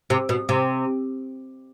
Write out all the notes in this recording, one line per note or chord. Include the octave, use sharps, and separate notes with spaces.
C3
B2
C3